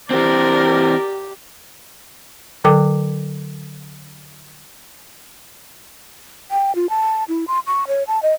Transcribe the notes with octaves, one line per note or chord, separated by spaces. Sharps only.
E3 C4 G4 A#4 D5
D3 F#3 A4 G5 D6
G5
F4
A5
E4
C6
C#6
C#5
A5
D#5